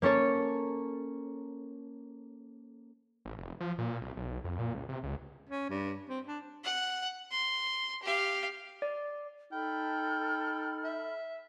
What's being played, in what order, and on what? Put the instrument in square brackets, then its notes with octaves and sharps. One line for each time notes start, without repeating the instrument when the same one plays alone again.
[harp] A#3 C#4 A4 C#5
[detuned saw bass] A1
F1
F3
A#2
C2
B1
F2
A#2
C#2
C3
C#2
[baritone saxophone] C#4
G2
C4
D4
[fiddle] F#5
C6
G4 F5
[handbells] D5
[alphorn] D#4 [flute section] A4 B5 F6 [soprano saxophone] G5
[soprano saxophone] E5